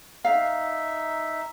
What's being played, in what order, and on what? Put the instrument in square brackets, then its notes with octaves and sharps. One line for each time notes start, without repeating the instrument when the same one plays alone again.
[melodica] D#4 E5 [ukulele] F5